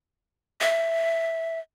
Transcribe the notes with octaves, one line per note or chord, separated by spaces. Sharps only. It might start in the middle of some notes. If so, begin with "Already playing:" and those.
E5